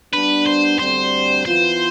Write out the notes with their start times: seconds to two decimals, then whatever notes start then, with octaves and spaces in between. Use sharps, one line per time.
0.13 G3 B3 D4 B4
0.46 C5
0.79 D2 D3 G3 C4 C5
1.45 E3 B3 F4 C5